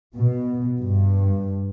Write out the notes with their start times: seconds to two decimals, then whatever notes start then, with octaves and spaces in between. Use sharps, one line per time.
0.17 B2
0.80 G2